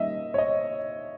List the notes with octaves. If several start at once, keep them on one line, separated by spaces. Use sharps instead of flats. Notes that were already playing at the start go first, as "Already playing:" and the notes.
Already playing: D#3 G3 A#3 C#4 D#5 E5
C#5
D#5